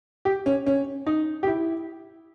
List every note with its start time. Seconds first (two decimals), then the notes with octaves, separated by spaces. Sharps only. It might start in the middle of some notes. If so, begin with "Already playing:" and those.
0.25 G4
0.46 C#4
0.66 C#4
1.06 D#4
1.43 G4
1.47 E4